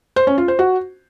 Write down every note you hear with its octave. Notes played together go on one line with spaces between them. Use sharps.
C5
C#4
F4
C5
F#4